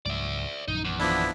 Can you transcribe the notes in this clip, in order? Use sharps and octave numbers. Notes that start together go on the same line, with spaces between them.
C#2 G#2 F#3 D5 E5
A#1 F#2 D#3 D#4
E2
F3 B3 D4 E4